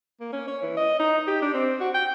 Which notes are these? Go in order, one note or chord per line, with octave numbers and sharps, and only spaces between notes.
A#3
C#4
C#5
E3
D#5
D#4
G4
D4
C4
F#4
G5